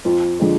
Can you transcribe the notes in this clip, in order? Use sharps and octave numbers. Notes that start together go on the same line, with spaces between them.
F2 F4
D3 F3 G#3